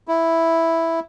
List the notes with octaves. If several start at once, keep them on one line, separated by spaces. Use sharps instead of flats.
E4